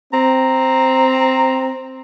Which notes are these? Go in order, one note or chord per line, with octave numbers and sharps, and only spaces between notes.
C4 A#5